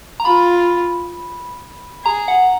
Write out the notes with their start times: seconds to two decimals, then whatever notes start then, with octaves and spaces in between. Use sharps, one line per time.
0.20 A#5
0.25 F4 B5
2.05 G#4 A#5
2.28 F#5